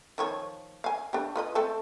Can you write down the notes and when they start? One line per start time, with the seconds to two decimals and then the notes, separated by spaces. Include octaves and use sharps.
0.18 D#3 F3 C#5
0.84 F5 G#5
1.13 D4 G4
1.36 F4 B4 D#5
1.55 A3 C4 A4